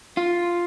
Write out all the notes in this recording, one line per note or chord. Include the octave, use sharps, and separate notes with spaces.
F4